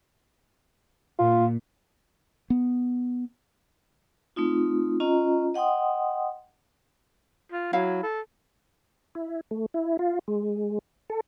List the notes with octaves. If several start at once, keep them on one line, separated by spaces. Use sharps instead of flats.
A#2 F4
B3
A3 C4 D#4 F4
C#4 F4 D#5 A#5
D#5 F#5 G5 C6 D#6
F4
F#3 E4 F5
A4
E4
A3
E4
F4
G#3
A4